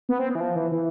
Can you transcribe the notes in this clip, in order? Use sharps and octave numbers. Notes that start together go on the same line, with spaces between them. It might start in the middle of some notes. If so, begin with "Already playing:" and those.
B3
C4
B3
E3
F3
E3
E3